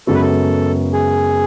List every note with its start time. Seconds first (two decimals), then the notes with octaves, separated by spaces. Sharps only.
0.07 F#2 C#3 G#3 B3 F#4 A4
0.14 B4
0.22 A4
0.93 G#4